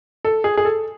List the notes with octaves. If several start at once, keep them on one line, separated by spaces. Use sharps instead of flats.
A4
G#4
G#4
A4